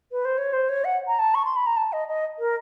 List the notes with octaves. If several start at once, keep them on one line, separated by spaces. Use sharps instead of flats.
B4
C5
C#5
C5
C#5
F#5
A#5
A5
C#6
C6
B5
A#5
A5
D#5
D#5
A#4